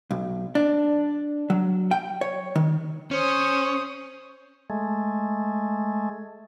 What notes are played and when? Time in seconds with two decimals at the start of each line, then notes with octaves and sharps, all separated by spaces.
0.11 B1
0.55 D4
1.50 F#3
1.91 G5
2.21 C#5
2.55 D#3
3.11 C#4 C5 D#6
4.70 G#3 A3